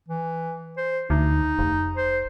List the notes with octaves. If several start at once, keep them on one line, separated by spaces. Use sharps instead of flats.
E3
C5
D2 D#4
F1
C5